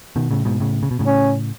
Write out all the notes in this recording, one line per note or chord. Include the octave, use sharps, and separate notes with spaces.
B2 D#3
A2 C#3
G#2 B2
A2 C#3
C#3
B2
A2 C#3
C#4